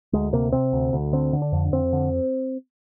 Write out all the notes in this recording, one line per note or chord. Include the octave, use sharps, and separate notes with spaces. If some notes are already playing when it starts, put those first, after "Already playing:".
D2 G#3
C3 A#3
C3 C4
D2
D2
D3 C4
D3
D4
F2
F2 C4
D3